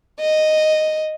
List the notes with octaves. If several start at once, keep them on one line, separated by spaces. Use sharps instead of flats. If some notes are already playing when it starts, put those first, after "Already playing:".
D#5